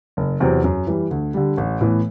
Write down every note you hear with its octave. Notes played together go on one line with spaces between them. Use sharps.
F#1
E2 C3 F#3 C4
F#2
E3 G3
D2
D3 G3
A1
A2 E3 B3